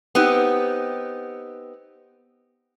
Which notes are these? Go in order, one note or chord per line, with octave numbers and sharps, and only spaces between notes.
B3 C4 D#4 G4